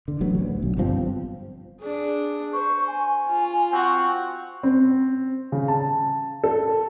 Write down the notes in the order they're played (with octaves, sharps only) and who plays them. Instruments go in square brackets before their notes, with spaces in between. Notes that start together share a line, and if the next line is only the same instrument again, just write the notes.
[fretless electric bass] D3
A1 F#3 B3
D2
B1
G1 G2 F3 C4
[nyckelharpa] D4 G#4
[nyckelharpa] C5 [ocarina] C#6
[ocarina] G#5
[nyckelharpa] F4
[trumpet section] C4 F#4
[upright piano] C4
C#3
A5
A4